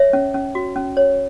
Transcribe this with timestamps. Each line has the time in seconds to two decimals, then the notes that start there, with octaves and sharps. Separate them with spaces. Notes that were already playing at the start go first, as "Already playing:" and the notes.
Already playing: C#5 E5
0.13 C#4
0.34 C#4
0.55 F#4
0.76 C#4
0.97 C#5